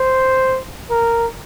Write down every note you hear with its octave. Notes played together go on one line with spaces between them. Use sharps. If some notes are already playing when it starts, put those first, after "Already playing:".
Already playing: C5
A#4